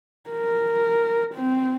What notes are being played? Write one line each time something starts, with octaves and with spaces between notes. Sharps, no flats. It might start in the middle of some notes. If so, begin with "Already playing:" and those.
A#4
C4